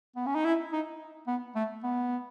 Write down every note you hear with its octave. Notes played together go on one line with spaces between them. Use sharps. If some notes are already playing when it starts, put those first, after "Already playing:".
B3
C#4
D#4
E4
D#4
B3
A3
B3